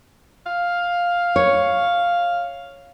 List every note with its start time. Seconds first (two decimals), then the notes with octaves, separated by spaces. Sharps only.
0.46 F5
1.36 C#5